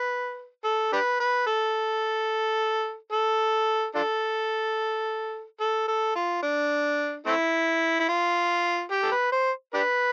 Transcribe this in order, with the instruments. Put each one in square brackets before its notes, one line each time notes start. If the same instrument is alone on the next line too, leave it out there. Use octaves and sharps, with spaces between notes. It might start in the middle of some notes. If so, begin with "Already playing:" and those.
Already playing: [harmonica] B4
A4
D4 G4 B4
B4
A4
A4
D4 F4 A4
A4
A4
F4
D4
A3 C4 E4
E4
F4
G4
A4
B4
C5
D4 G4 B4